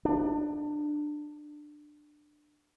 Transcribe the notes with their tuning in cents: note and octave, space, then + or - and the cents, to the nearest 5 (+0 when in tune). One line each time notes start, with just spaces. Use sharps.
D4 +20